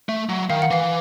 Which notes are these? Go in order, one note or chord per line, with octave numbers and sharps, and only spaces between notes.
A3
F#3
D#3 F5
F#5
E3 F5